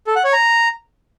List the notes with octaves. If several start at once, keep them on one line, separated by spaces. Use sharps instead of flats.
A4
F#5
C#5
A#5